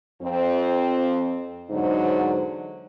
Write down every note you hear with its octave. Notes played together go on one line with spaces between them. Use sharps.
F2 C4
E2 G#2 D3 F#3 D#4 C5